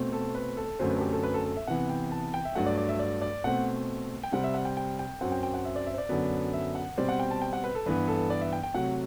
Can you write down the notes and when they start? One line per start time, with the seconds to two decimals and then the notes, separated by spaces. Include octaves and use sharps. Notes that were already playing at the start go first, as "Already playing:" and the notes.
Already playing: B2 A3 C4
0.12 A4
0.35 B4
0.57 A4
0.79 F#2 D3 F#3 A3 C4 C5
0.90 B4
0.96 A4
1.01 G4
1.12 A4
1.23 B4
1.34 A4
1.45 A4
1.57 E5
1.67 C3 E3 B3 F#5
1.90 G5
2.12 A5
2.34 G5
2.45 E5
2.55 G2 F#3 A3 F#5
2.66 D5
2.78 D5
2.89 E5
2.99 D5
3.22 D5
3.44 B2 A3 C4 F#5
4.24 G5
4.32 C3 G3 C4 F#5
4.44 E5
4.54 F#5
4.65 G5
4.77 G5
4.99 G5
5.21 F#2 F#3 C4 F#5
5.32 G5
5.43 G5
5.54 F#5
5.65 E5
5.76 D5
5.87 E5
5.94 C5
5.98 D5
6.09 F#2 D3 F#3 B3
6.53 E5
6.75 F#5
6.98 B2 G3 C4 D5
7.09 F#5
7.19 G5
7.31 A5
7.42 G5
7.53 F#5
7.64 B4
7.75 A4
7.86 G2 E3 B3 B4
8.08 A4
8.30 D5
8.41 E5
8.53 G5
8.64 G5
8.74 C3 F#3 A3 F#5